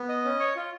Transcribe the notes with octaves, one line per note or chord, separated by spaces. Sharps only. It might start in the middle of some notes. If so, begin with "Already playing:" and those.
Already playing: B3
D#5
C#4
C#5
F4